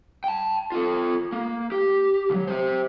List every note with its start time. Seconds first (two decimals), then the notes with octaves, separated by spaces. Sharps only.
0.24 G5 A5
0.72 F4 A4
1.32 A#3
1.72 G4
2.30 C#2 F#3
2.47 G4 C5